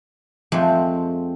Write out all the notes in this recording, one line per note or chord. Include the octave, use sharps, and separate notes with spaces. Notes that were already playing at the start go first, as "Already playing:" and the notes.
F2 G#3 A3 C4